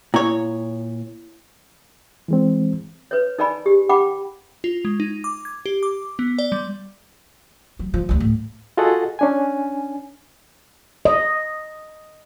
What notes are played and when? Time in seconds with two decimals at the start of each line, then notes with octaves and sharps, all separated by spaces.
0.14 A#2 E4 C#5
2.28 E3 G#3 C4
3.11 B4 C#5
3.38 D#4 A#4 D5 G#5 B5
3.66 G4
3.89 F#5 G5 B5 D6
4.64 F4
4.85 G#3
5.00 D#4
5.24 D6
5.45 G#6
5.66 G4
5.83 D6
6.19 B3
6.39 D5
6.52 G3
7.79 F#3
7.94 F3
8.09 D2 G3
8.20 A2
8.77 F4 F#4 G#4 A4 D#5 F#5
9.19 C#4 D4 G#5
11.05 D#5